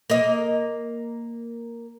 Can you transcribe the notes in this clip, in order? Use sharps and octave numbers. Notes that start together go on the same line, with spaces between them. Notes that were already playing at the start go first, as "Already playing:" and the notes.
A#3 D#5